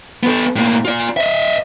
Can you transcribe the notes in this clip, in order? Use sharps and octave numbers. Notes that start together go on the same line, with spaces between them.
B3 A4
A2 A#3
F4 D5
D#5 E5